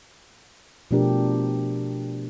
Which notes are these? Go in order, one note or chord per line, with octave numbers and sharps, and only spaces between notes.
B2 F3 A3 D4 G4 A#4